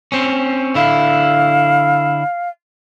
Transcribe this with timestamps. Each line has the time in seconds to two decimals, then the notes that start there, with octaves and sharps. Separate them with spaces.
0.12 C4 C#4
0.75 D3 E4 F5